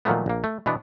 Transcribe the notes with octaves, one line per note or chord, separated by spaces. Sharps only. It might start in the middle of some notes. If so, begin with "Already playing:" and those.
A#2 D#3 F3 F#3 A3 B3
A#1 A#3
A3
B2 E3 B3 D4